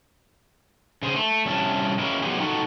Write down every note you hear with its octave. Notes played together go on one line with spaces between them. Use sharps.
C#3 G#4 C5
A3
G2 C3 C#4 E4 A5
G#3 A#3 C#4 E4
F#3 B3 D#4 F4 G4 G#4
D#4 F4 F#4 A4